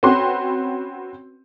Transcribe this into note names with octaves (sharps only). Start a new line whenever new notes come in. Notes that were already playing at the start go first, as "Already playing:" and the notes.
C4 C#4 F#4 B4 C6